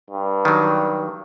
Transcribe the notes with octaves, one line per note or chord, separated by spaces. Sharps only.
G2
D#3 F#3